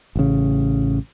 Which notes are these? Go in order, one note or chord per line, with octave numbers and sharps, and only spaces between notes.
A1 C#3